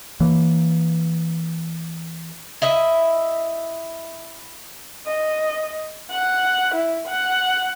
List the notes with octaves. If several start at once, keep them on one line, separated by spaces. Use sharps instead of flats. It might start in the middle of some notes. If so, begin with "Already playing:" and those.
E3 A#3
E4 D#5 E5
D#5
F#5
E4
F#5